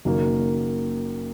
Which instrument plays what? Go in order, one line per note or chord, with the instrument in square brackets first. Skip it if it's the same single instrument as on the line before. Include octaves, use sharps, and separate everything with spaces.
[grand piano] F#1 F#2 D#3 F#3 A#3